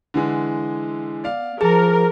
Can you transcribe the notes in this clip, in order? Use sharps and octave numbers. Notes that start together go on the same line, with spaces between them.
D3 E3 G#3
B3 D5 F5
F3 G#4 A#4 A5